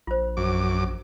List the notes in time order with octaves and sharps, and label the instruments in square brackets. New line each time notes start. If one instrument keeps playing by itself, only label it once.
[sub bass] A#1 [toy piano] F4 C5
[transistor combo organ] F#2 D6